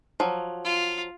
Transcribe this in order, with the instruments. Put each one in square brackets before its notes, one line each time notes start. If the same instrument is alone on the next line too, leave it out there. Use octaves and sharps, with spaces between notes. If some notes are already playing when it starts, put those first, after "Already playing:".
[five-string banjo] F3 F#3
[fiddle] F4